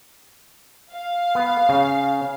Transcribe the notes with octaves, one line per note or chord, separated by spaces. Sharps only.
F5
B3
C#3